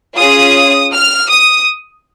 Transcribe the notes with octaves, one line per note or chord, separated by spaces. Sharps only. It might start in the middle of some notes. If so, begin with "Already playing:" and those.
C#4 F4 G#4 D#6
F6
D#6